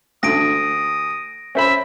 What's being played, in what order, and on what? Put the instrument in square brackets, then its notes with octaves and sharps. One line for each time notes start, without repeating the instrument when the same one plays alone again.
[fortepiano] D2 D3 [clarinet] D#6 [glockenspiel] A#6 D7
[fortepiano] C#4 C5 B5 [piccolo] E5